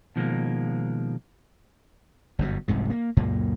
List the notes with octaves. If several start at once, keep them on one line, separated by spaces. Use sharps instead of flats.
B2 D#3 F3 G3 G#3 A#3
G1 F#2 B2
F1 C2 G#2 C3
A#3
C#2 F#2 A#2 A#3